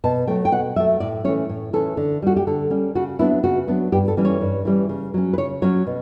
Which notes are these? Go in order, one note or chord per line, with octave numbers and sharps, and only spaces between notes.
B2 A5
F#3 A3 G5
G5
B2 F#5
F#3 A3 E5
A2 D5
E3 A3 C#4 C#5
A2
E3 A3 C#4 A4
D3
G3 C#4 F#4
G4
D3 A4
G3 C#4
C#3 F#4
F#3 B3 D4 E4
C#3 F#4
F#3 B3 D4
G2 G4
A4
E3 G3 C#4
C#5
G2
E3 G3 C#4
C#3
F#3 C#4
B4
C#3 C#5
F#3 C#4 C#5
B2